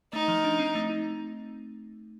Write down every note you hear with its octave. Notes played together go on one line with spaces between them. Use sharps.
A3 D#4
F3
D4
C4
A3
D#4